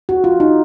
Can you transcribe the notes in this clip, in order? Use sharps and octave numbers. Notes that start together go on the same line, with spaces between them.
F#4
F4
D#4